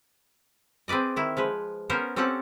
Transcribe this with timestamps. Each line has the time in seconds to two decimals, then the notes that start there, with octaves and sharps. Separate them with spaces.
0.88 C4 G#4 B4 D5 D#5
1.16 D#3 E4
1.37 F3 G#3 B4
1.90 B3 C#4 A#4 C5
2.16 C4 C#4 G4 A4 F#5